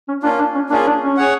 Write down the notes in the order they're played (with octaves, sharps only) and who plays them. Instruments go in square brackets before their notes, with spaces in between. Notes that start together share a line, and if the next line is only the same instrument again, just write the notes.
[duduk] C#4
[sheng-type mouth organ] A#3 C#4 F4 [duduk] D4
[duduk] D4
C#4
[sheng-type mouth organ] A#3 C#4 F4 G#4 [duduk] D4
[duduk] D4
C#4
[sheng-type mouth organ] G#4 C#5 F#5